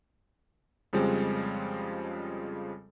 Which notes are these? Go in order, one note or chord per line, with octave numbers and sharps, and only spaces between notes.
F2 C#3 F3 G3 G#3 C4